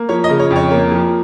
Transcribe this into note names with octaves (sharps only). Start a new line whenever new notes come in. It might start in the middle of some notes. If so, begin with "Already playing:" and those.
Already playing: A#3
F3 C#5
D#5
C#3
C#5
F2
C#5
A#3
F3